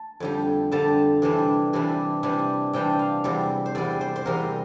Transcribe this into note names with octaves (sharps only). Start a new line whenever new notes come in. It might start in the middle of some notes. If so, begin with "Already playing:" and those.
Already playing: A5
F2 D3 G3
F2 D3 G3 A5
C3 E3 G3 D4
C3 E3 G3 D4
C3 E3 G3 D4
C3 E3 G3 D4 G5
F5
E2 C3 G3
C5
E2 C3 G3 D5
C5
C5
E2 C3 G3 A#4